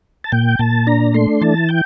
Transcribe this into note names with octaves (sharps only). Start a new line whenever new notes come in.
A5
A#2 G5
A#2 A5
D4 A#5
A3 C6
E3 A5
G5